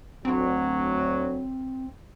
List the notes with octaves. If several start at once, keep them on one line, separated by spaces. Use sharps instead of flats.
D2 F#3 C4